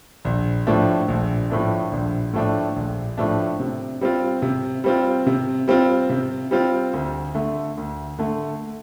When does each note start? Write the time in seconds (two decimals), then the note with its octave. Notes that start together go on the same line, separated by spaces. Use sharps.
0.25 A#1
0.67 A2 F3 A3 D4
1.08 A#1
1.50 A2 F3 A3 D4
1.92 A#1
2.33 A2 F3 A3 D4
2.76 A#1
3.18 A2 F3 A3 D4
3.60 C3
4.01 G3 C4 F4
4.42 C3
4.84 G3 C4 F4
5.26 C3
5.68 G3 C4 F4
6.10 C3
6.51 G3 C4 F4
6.93 D2
7.35 D3 A3
7.77 D2
8.18 D3 A3